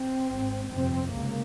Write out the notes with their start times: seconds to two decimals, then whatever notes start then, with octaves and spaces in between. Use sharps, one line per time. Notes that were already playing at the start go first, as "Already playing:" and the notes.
Already playing: C4
0.30 G#1 G#2
0.70 G1 F2 C3 C4
1.11 C#2 C3 A#3